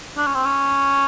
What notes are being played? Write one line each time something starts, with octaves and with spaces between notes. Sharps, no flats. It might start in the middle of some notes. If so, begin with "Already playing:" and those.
D4
C#4
C4
C#4